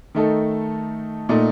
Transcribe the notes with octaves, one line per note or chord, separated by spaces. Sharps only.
D#3 A3 D#4 A4
A#2 A3 D#4